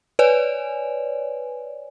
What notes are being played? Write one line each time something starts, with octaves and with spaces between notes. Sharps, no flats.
B4 C#5 D5 G#5